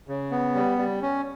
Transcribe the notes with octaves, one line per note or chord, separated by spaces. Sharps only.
C#3
B3
G3
G3
C#4